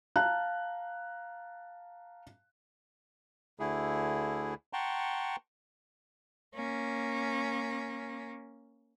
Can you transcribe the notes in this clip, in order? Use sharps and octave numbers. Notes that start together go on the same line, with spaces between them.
F5 A5 A#5 F#6
D2 D3 A3 E4 G#4
F#5 G5 A5 A#5 C6 C#6
A#3 C#4